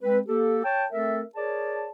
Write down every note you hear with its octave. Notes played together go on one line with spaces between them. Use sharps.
G#3 C4 B4
A#3 G4 A4
C#5 G5 A5
A3 C4 A4 A#4 E5
G#4 A#4 C#5 D5 A5